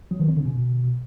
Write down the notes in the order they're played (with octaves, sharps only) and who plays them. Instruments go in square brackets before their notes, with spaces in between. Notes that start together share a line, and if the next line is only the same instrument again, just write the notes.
[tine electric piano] F#3
D#3
C4
D3
B2